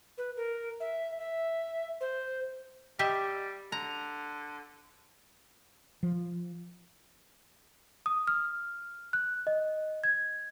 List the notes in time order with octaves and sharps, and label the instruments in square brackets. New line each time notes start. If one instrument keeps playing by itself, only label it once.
[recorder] B4
A#4
E5
E5
C5
[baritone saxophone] G3 [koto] G4 D#5 E5
[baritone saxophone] D3 [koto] A#5
[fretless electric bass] F3
[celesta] D#6
F6
F#6
D#5
G#6